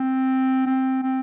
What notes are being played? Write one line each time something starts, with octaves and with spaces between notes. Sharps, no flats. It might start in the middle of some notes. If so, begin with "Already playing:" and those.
Already playing: C4
C4
C4